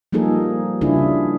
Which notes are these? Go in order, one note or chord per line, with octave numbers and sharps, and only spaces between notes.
F3 G3 A#3 D#4 G#4 A4
C#3 G3 D4 E4 F4 G#4